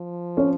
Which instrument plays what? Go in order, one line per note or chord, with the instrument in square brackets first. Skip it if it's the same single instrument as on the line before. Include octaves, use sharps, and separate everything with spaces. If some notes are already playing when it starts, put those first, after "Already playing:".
Already playing: [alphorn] F3
[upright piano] C#4